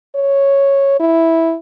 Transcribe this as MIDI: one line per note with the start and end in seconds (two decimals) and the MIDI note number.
0.15 0.97 73
1.00 1.55 64